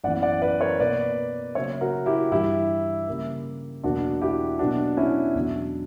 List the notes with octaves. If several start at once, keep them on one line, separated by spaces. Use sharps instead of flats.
F#2 E3 B3 D5 F#5
D5 F#5
B4 D5
A#4 C#5
B2 A#3 B4 D5
C#3 F#3 A#3 C#5 E5
F#4 A#4
E4 G4
G2 E3 G3 E4 G4
C#3 G3 A#3
E2 B2 F#3 A#3 D4 F#4
E4 G4
B2 F#3 A#3 D4 F#4
C#4 E4
E2 B2 F#3 D4